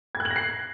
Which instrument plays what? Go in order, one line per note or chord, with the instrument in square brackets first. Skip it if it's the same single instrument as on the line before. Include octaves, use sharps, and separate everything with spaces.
[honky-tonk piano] G#6
F#6
F#7
A#6
C7